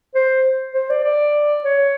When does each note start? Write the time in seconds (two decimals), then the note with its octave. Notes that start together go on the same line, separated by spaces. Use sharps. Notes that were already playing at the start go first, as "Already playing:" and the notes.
0.15 C5
0.74 C5
0.90 D5
1.04 D5
1.64 C#5